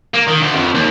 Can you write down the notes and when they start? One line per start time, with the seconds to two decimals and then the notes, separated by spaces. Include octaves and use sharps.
0.14 A#3
0.28 D#3
0.41 D2
0.55 F2
0.75 D#2